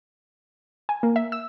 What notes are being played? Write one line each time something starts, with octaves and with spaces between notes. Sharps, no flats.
G#5
A#3
E5
E6